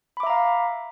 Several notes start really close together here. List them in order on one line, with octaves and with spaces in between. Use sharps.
B5 D6 E5 A#5 F5